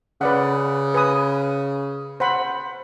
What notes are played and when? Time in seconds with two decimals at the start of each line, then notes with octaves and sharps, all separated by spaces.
0.21 C#3 B4 D5 F#5
0.94 B4 G#5 D#6
2.20 C5 F#5 B5